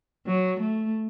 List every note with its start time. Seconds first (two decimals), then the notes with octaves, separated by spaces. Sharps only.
0.27 F#3
0.60 A3